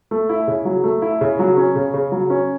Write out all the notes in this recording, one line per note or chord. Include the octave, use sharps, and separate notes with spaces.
A3
E4
C#3
F#3
A3
E4
C#3
F#3
C#4
C#3
C#3
F#3
C#4